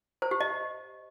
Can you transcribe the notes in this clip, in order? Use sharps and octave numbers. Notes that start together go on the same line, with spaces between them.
C5
G4
D#5